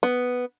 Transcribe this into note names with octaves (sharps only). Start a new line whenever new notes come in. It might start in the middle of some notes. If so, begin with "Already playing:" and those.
B3